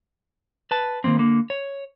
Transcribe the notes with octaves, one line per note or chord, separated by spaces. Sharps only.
B4 A5
D#3 F#3 A#3 C4
D3 A#3
C#5